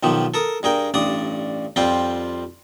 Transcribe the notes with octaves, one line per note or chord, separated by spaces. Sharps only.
B1 D#3 F3 G4
A4 A#4 D#6
G2 G#4 A#4 G5
A1 G2 D4 D5 D#6
F2 G3 C4 F4 G5